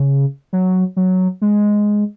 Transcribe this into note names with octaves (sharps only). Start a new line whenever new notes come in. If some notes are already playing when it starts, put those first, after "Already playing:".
Already playing: C#3
F#3
F#3
G#3